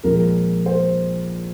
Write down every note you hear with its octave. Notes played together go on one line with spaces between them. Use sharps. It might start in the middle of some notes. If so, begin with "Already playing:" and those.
A#1 A#2 F3 G#3 A#4
C5